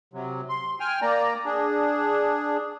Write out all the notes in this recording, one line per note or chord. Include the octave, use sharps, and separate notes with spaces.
C3 F#3
C6
G5 G#5 F6
A#3 D5 A#5
D4 G#4